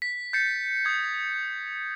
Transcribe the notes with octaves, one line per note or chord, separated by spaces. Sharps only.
B6
G6 A6 C7 C#7
D#6 G#6